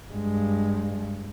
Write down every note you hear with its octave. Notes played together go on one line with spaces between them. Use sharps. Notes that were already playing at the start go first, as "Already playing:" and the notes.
G2 G#3